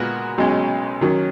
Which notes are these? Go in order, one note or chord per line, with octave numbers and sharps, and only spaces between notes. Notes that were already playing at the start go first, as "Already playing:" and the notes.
Already playing: A#2 G#3 B3 F#4 A#4
B1 B2 G#3 C#4
D#3 F#3 C#4